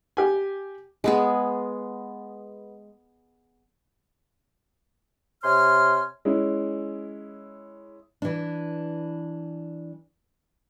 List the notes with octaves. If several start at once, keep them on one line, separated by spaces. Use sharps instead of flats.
G4 G#5
G#3 B3 G#4
C3 C#5 G#5 C6 F6
G#3 C#4 E4
E3 D4